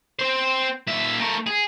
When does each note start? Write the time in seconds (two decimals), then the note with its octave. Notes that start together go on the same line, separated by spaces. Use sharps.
0.19 C4 C5
0.88 A#2 E5
1.20 A3 A#4
1.46 G#4